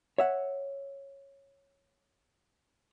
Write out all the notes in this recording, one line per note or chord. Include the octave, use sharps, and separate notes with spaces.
C#5 E5 F#5